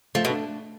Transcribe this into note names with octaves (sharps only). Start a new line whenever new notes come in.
F3 A3
B2
D4